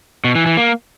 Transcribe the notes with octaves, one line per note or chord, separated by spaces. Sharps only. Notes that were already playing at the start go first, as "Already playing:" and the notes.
B2
E3
E3
A#3